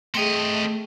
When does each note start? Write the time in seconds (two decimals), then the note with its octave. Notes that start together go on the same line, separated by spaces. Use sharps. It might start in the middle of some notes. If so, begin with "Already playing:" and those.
0.15 A3 C4 G#4 D#5 G5 C#7